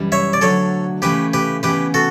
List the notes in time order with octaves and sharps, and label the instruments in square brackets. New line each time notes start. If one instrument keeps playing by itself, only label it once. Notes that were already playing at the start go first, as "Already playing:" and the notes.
Already playing: [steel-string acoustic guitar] F#2 E3 G3
[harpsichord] C#5 E5
D5
[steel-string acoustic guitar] D2 D3 F#3 [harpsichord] A4 C#5
[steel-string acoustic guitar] C#3 E3 A3 [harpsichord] G4 B4
[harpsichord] G4 B4
[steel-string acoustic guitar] C#3 E3 B3 [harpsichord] G4 B4
[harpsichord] F#4 A4